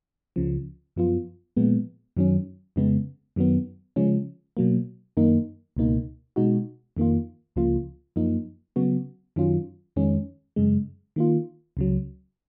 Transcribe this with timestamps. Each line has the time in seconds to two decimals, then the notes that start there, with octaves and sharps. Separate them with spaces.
0.36 C#2 C#3 F3
0.96 F#2 F3 B3 F4
1.56 A#2 F3 G#3 B3
2.17 F#2 D#3 F#3 C#4
2.76 F2 C#3 G#3 B3
3.36 F#2 D#3 F#3 B3
3.96 C#3 F3 G#3 C#4
4.57 B2 F#3 A#3
5.17 F#2 D#3 A#3 D#4
5.77 C#2 B2 A#3 D#4
6.36 B2 G#3 D#4 F#4
6.97 F2 D#3 A#3 F4
7.56 C#2 C#3 F3 A#3 F4
8.16 F#2 F3 A#3 D#4
8.76 C#3 F#3 B3 F#4
9.36 F#2 D#3 F#3 C#4 F4
9.96 F2 D#3 G#3 C#4
10.56 F#2 C#3 G#3
11.16 D#3 A#3 F4
11.77 C#2 C#3 F#3